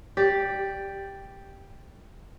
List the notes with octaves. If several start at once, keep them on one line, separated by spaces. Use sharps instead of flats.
G4 D5